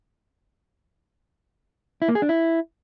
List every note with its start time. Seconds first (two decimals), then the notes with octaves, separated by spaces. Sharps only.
2.02 E4
2.08 A#3
2.15 G#4
2.22 D4
2.29 E4